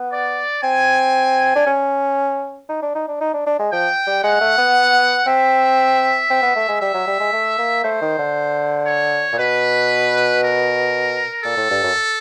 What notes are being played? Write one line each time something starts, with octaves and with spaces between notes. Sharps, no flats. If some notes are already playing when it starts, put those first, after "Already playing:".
Already playing: B3
D5
C4 G#5
D4
C#4
D#4
D4
D#4
D4
D#4
D4
D4
G#3
F3 G5
G3
G#3 F#5
A3
B3
C4 E5
C4
B3
A3
G#3
G3 E5
F#3
G3
G#3
A3
A#3
A3 C5
D#3
D3
C#5
A#2
B2 B4
A#4
A#2 A4
A2
G2
F#2